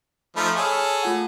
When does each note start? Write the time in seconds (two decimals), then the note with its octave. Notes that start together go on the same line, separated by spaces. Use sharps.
0.36 F3 A3 D#4 B5 F6
0.56 G#4 A4 C#5 B5 C#6
1.03 A3 F4 F#5